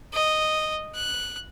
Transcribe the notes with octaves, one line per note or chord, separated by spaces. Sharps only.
D#5
F#6